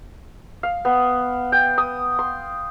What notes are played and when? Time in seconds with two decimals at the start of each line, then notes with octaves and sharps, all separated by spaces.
0.63 F5
0.85 B3
1.52 G5
1.78 D#6
2.19 C6